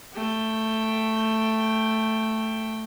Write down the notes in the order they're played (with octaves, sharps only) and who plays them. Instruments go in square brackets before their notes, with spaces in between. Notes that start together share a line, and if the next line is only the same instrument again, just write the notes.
[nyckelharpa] A3 G5